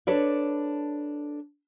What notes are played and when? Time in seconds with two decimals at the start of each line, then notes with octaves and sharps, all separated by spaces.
0.07 D4 A4 B4 C#5 D5